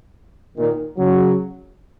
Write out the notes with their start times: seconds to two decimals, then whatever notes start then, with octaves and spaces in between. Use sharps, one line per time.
0.58 A#2 D#3
0.98 C#3 F#3